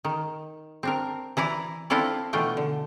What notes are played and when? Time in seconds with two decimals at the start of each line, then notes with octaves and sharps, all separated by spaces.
0.05 D#3
0.83 C4 D4 A#4
1.37 E3 E4 D5 A#5
1.90 C4 D4 E4 F4 A4 D5
2.33 B2 E3 A3 D4 F4 G5
2.57 D3